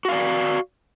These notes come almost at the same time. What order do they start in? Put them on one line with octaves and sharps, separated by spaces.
F#4 F5 D5